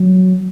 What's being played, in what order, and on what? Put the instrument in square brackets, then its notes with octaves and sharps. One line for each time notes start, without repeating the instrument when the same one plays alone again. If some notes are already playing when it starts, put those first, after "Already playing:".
Already playing: [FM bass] F#3